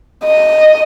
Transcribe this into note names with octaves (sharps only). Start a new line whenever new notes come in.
D#5